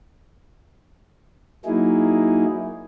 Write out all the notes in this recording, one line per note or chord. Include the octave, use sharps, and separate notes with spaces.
F#3 A#3 D#4 E4 G#4